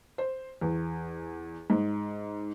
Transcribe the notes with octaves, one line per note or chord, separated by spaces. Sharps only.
C5
E2
G#2